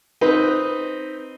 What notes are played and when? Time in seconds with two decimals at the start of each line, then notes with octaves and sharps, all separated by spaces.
0.21 C4 D#4 B4 D#5